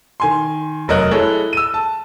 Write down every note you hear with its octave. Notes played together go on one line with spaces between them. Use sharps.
D#3 G#5 C6
F1 F#3 A#4 D#5 F#6
G#3 E4 A4 C#5
E6 D#7
A5